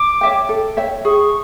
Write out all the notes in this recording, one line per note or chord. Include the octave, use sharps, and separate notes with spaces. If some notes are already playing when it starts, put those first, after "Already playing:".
Already playing: D6
C#5 E5 G5
A4
C#5 E5 G5
G#4 C#6